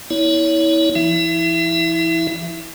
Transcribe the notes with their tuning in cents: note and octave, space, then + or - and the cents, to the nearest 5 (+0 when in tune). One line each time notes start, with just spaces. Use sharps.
B3 -10 E4 -30 C#5 +30
E3 +45 E4 -15 E5 +25